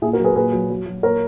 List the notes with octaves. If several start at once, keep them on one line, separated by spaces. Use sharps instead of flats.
A#2 E4 G#4
F#4 A#4
F#3
G#4 B4
A#2 G#4 B4
F#3
F#3
F#3
A#2 A#4 C#5